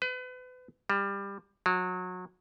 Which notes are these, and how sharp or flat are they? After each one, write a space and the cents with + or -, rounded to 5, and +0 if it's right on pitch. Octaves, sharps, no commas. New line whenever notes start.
B4 +35
G3 +20
F#3 -25